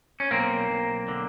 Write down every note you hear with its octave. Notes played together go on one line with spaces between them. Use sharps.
C#4
B1 A#3 C4
B1
D3